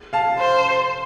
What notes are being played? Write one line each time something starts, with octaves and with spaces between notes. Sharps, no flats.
F5 A5
C5